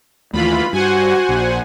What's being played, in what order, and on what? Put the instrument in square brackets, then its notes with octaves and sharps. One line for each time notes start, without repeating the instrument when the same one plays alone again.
[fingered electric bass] D#2 A3 [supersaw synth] E3 F4 B5
[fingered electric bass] G2 [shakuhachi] F#4 [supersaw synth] C5 F#5 G#5
[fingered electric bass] A#1